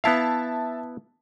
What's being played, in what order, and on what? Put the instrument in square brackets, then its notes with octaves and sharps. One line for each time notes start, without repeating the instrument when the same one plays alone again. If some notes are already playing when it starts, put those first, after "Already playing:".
[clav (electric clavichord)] B3 E4 F5 [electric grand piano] E5 A5